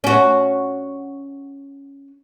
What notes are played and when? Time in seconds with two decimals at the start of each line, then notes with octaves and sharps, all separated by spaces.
0.04 C#4 F#4